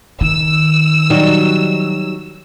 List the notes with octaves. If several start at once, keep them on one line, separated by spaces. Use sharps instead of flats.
D#3 E6
F#3 G3 D#4